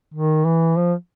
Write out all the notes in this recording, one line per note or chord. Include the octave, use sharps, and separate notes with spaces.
D#3
E3
F3